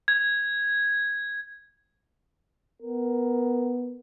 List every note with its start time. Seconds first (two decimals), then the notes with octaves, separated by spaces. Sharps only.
0.08 G#6
2.82 B3 A#4